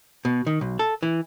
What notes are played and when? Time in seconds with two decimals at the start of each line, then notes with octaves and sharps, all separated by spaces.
0.25 B2
0.47 D#3
0.61 B1
0.79 A4
1.03 E3